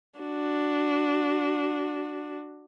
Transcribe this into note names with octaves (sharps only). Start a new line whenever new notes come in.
D4 F#4